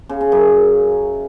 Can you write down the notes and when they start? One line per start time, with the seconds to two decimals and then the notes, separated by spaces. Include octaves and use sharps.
0.09 C#3
0.21 C#3
0.32 F#2